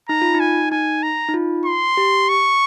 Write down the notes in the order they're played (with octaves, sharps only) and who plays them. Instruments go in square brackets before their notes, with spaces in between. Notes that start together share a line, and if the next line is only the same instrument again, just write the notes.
[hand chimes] D#4 [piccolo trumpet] A#5
[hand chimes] F4
D#4
[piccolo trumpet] G#5
[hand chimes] D#4 [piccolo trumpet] G#5
[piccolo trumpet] A#5
[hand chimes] D#4
F4
[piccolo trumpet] C6
[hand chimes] G4
[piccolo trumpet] C#6